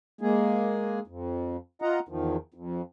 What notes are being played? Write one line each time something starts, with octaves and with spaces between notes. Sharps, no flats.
G#3 A#3 G#4
F2
F4 D#5 F#5 A#5
E2 D#3 F3
F2